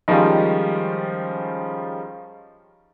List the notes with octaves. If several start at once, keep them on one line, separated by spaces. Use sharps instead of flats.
D#3 F3 G3 G#3 C#4 F4